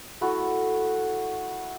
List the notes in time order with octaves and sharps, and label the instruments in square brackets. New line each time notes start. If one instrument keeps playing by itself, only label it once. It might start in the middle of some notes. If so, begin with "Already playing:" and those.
[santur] A3 E4 F#4 A4